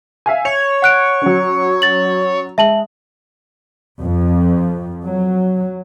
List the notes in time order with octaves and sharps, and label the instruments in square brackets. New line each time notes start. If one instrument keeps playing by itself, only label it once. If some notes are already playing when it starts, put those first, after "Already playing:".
[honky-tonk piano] E5 F5 G#5
[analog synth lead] C#5 [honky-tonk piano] F7
[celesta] F#5 F#6 D7
[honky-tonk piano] F#3 C#4
[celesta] A6 F#7
[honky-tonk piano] G#3 [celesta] E5 A5 F#7
[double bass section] F2
F#3